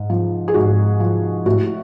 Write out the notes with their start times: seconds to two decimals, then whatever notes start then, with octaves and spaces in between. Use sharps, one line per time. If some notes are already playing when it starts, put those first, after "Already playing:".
Already playing: G#2
0.10 F3
0.48 G#4
0.54 G#2 F#4
1.00 F3
1.46 A2 F#4